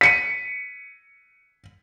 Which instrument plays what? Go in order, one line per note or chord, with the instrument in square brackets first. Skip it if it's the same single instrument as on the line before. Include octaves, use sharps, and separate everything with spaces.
[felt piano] B6 C#7 D#7